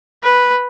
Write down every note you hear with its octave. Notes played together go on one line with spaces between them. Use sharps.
B4